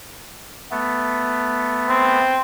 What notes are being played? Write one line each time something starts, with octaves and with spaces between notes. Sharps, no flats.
A3 B3
C4